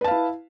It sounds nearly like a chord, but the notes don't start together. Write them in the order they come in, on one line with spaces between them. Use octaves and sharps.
B4 A5 F5 E4